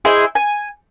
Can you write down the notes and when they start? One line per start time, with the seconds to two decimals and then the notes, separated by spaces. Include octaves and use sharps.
0.05 E4 G#4 C5 D#5
0.35 G#5